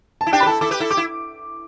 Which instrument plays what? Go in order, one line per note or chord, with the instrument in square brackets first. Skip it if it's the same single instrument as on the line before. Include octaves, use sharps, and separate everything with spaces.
[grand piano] A5
[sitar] E4
[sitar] D4 G4 [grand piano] G5
[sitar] B4 [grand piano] B5
[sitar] E4 A4 [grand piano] A5
[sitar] E4 A4 [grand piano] D6
[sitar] G4 B4
E4 A4
[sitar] G4 [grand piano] D6
[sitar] E4